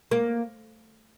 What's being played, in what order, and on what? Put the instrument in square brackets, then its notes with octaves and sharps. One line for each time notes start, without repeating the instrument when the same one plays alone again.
[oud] A#3